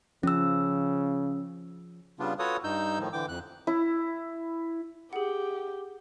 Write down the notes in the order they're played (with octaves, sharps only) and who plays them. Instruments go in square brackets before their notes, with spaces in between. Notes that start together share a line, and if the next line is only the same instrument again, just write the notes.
[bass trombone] C#3 [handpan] F3 [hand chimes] C#4 E6
[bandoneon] C#3 G3 B3 D4 F4
F4 F#4 A4 B4 C#5 D#6
G2 D#4 E6 G6
A2 D#3 F3
D3 E3 G5 D6
F2 F#6
[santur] E4
[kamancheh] G4 [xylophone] G#4 F#5